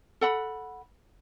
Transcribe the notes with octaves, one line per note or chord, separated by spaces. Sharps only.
A4 F#5 B5